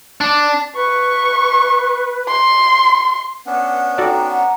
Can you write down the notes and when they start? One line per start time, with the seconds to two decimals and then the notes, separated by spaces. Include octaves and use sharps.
0.21 D4
0.76 B4 C#6
2.28 C6
3.46 B3 C#4 D4 B4 F#5
3.98 D#4 F#4 A4 D5 G5 A#5
4.29 F#5 A#5